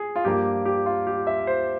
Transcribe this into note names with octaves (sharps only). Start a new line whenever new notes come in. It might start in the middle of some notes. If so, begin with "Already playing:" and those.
Already playing: G#4
F4
G2 F3 A#3 G4
G4
F4
G4
E5
C5